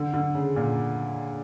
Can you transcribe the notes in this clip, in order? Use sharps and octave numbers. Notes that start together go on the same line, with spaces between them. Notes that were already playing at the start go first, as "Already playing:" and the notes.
Already playing: D3
D3
C#3
A#2